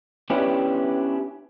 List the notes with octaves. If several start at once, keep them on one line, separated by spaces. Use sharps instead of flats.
B3 C#4 D4 E4 G4 B4